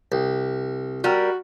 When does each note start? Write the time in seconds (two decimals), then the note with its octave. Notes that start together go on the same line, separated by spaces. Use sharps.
0.12 C2
1.04 G3 F#4 A#4